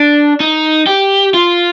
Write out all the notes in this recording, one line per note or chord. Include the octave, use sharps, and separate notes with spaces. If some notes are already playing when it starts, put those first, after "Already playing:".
Already playing: D4
D#4
G4
F4